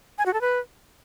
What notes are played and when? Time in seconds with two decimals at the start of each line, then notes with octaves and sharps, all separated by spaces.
0.18 G#5
0.26 F#4
0.34 A4
0.41 B4